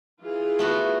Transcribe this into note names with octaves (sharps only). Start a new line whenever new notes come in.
E3 F4 G#4
A3 B3 F#4